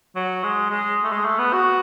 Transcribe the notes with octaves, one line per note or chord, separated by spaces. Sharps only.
F#3
G#3
G#3
A3
G#3
A3
B3
F#4